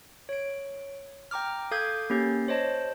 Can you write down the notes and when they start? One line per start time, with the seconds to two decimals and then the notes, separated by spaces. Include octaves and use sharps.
0.29 C#5 D7
1.31 G5 A#5 D6 F6
1.71 A4 F5 D6 D#6 G6 G#6
2.10 A#3 C#4 G4 G6
2.48 C5 C#5 D#5 A5